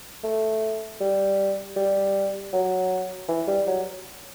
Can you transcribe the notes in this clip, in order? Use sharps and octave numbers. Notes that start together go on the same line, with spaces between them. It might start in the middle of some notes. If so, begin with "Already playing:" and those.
A3
G3
G3
F#3
E3
G3
F#3